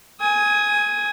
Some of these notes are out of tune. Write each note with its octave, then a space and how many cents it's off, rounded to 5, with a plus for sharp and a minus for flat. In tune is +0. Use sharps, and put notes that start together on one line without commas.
G#5 +0 D#6 +30